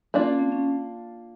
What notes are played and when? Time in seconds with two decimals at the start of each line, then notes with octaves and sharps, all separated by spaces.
0.14 A#3 C#4 D4 F4
0.27 C#4
0.39 C4
0.52 C#4